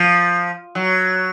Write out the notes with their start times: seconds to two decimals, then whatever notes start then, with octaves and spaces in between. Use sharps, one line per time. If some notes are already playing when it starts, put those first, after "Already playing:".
Already playing: F3
0.75 F#3